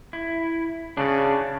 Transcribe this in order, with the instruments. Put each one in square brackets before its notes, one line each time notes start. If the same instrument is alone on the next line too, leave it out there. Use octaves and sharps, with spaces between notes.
[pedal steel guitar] E4
[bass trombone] C#3 [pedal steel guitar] D4 F#4 D5